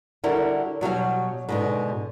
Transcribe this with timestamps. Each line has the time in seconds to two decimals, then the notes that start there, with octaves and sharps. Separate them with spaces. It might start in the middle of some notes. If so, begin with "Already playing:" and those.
0.24 D3 G3 E4 F#4 A#4
0.81 B2 F#3 G3 F5
1.49 G#2 B2 D3